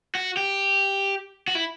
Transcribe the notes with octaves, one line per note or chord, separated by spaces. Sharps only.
F#4
G4
F#4
E4